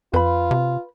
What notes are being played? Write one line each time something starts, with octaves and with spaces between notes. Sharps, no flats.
F2 F4 B4 B5
C3